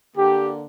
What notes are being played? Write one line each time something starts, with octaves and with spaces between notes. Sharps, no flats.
D3 A#3 D4 G4